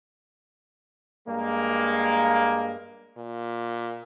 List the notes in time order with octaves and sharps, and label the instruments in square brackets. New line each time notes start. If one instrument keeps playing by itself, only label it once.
[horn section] G2 G#3 A#3
[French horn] A#2